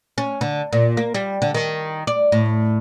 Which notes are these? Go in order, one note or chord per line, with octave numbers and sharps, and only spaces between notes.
C#4
D3
A#2
A#3
G3
D3
D#3
D5
A2